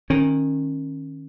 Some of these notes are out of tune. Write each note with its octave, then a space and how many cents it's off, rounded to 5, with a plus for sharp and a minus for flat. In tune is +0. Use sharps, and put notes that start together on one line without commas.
D#3 -10 C#4 -25